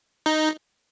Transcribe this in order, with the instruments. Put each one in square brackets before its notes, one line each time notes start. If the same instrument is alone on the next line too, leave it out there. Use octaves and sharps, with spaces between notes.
[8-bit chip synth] D#4